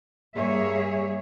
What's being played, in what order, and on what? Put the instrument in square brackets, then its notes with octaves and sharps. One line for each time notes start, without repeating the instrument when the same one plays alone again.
[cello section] G2 G3 A#3 G#4 C#5 E5